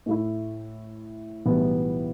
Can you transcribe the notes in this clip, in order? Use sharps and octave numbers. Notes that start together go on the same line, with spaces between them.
A2 A3 E4
B1 A2 E3 G3 B3